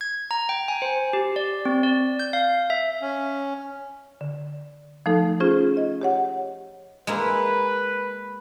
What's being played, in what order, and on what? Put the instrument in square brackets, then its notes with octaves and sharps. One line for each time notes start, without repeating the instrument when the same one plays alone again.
[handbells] G#6
A#5
G5
G#5
C5
G4
D5
C4
D5
G6
F5
E5
[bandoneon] C#4
[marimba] D3
F3 A3 D#4 A4
C#4 F4 G#4 C5
D#5
G4 C#5 F#5
[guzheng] G#3 A#3 E4 [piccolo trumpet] B4